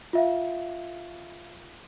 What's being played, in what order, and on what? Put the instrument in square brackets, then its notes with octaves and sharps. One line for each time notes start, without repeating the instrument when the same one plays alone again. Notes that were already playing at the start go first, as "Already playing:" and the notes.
[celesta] F4 E5 F5